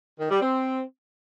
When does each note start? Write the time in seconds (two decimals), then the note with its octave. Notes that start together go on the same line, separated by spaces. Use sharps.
0.19 D#3
0.30 G3
0.42 C4